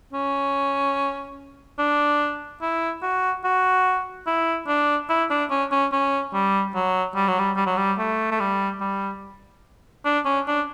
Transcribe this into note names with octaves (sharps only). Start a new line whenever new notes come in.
C#4
D4
E4
F#4
F#4
E4
D4
E4
D4
C#4
C#4
C#4
G3
F#3
G3
F#3
G3
G3
F#3
G3
A3
A3
G3
G3
D4
C#4
D4